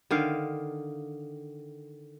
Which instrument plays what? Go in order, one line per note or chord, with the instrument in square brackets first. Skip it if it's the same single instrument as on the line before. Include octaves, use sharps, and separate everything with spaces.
[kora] D3 D#3 F5